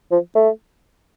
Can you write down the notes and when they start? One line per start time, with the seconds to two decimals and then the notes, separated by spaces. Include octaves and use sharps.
0.11 F3
0.35 A3